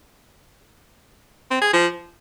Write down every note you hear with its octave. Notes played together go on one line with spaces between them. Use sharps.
C4
G#4
F3